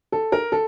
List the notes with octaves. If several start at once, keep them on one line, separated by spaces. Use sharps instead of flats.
A4
A#4
A4